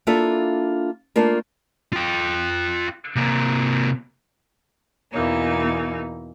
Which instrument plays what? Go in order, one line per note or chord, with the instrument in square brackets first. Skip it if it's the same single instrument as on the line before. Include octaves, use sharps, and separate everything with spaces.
[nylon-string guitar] A#3 D4 E4 F4 A4 E5
A3 A#3 D4 F4 A#4
[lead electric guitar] F4 G5
C3 A#3
[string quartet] E2 B2 E3 A#3 D#4